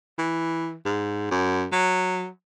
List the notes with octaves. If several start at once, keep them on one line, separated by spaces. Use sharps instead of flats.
E3
G#2
F#2
F#3